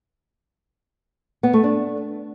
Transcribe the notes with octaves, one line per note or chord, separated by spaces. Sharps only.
B3
A3
D4